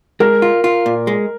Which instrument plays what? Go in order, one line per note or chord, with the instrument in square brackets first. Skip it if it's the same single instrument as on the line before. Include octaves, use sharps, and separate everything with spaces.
[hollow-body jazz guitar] G#3 [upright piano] A#4
[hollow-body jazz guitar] F4
F4
A#2
G#3